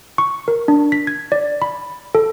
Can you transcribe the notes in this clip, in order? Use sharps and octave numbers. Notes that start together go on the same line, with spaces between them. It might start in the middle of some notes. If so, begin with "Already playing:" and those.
C#6
A#4
D4
B6
G#6
D5
B5
A4